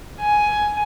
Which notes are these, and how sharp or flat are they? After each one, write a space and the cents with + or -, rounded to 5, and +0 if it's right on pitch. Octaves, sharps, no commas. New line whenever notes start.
G#5 +10